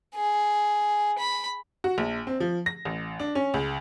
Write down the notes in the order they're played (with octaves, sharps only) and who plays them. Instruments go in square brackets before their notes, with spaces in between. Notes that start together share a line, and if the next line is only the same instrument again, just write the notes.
[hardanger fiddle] G#4
B5
[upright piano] F#4
A#1
C4
F3
A#6
A1
D4
C#4
C#2